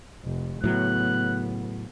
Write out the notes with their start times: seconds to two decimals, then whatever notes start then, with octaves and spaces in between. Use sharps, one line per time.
0.25 F1
0.64 A2 C#3 F#3 B3 F#6